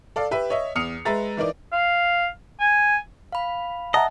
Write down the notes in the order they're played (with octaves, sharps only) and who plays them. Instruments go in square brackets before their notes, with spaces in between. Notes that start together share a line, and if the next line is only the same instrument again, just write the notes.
[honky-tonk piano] A4 D5 F5
G4 B4 E5
C#5 D#5 E5
E2 D#6 F6 C7 C#7 F7
G#3 B4 E5 A#5 A6
E3 D#4 A#4 D5
[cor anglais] F5
G#5
[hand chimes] F5 B5
[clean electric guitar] D#5 [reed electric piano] E5 F#5 A5 [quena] A#5